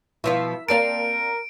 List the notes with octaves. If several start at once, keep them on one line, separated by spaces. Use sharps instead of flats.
B2 F3 E4 F4 E6 B6
A#3 C4 A#4 D5 F5 A5 D7